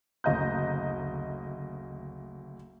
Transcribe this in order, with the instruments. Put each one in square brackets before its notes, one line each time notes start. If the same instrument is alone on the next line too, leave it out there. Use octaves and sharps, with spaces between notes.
[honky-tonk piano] F#1 D2 D#5 A#5 G6